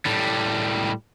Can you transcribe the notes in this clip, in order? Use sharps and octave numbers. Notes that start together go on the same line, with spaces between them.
A2 G3